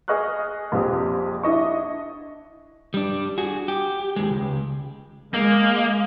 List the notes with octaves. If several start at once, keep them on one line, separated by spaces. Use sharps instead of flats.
G#4 D#5 C#6 F6 F#6
A#1 F2 C4 G4 D#6
D4 E4 D#5 C#6
G3 D4
F#4 G#4
G4
D#2 G#3
C#2
G#3 A#3